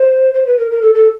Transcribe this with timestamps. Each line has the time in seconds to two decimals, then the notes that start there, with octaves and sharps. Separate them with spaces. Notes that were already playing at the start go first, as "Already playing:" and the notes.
Already playing: C5
0.34 C5
0.47 B4
0.59 A#4
0.71 A#4
0.82 A4
0.95 A4